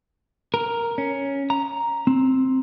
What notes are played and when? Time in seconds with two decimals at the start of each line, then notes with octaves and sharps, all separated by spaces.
0.54 A#4
0.98 C#4
1.50 A#5
2.07 C4